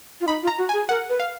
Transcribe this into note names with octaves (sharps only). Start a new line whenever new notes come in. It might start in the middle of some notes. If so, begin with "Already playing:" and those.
F4
D#4 B5
F4
A#5
F#4
G#5
G#4
A#4 F#5
B4
F5